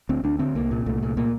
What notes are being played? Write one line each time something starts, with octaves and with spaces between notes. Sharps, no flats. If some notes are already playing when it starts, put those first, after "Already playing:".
D2 C4
D2 D4
D3 C4
C2 A#3
A#2
C2 A3
A#2
A#2 A#3